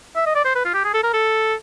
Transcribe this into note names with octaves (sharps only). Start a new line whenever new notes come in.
E5
D#5
D5
C5
B4
F4
G4
G#4
A4
A#4
A4